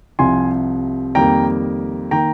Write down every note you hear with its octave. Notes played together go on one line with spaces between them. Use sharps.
C2 C3 F3 G#5 C6
F2 D#3 G3 A#3 G5 A#5
D#3 A#3 G5 A#5